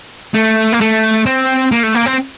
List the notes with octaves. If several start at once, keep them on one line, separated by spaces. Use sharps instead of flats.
A3
A#3
A3
C4
A#3
A3
A#3
C4